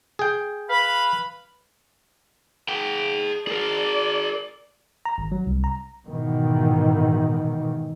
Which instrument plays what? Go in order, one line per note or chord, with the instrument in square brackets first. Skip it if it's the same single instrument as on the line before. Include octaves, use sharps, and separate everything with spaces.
[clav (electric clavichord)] G#4 G5
[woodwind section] B4 F5 B5
[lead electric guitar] G#4 G5
[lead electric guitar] G#4 A#4 [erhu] D5
[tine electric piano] A#5
G#1
F#3
C2
A#5
[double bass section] G#2 B2 D#3 E3